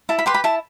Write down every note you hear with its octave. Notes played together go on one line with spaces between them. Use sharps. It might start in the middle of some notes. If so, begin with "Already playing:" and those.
E4 A5
B5
G4 B4 C6
B5
E4 A5